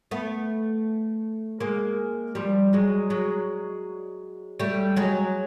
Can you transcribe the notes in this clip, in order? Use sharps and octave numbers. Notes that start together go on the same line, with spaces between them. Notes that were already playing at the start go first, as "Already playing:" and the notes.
A3 B3
G#3 A#3
F3 G3
F#3 G#3
F#3 G#3
G3 A3
F#3 G#3